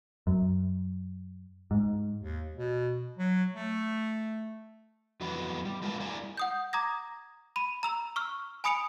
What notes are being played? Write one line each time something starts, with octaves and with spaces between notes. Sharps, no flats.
F#2
G#2
D#2
B2
F#3
A3
F2 E3 F#3 B3 B4
G3
G#3 F4 A#4 B4 F5 A5
G3 E4 A#4 D5 G#5
F#5 D#6 G6
A#5 D6 D#6 G#6 A#6
B5 D#7
A#5 E6 F7
C#6 E6 F6
G#5 B5 D#6 C#7 D7 F7